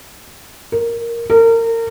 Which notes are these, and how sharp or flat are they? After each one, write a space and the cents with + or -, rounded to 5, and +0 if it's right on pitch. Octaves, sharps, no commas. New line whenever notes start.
A#4 +0
A#4 -30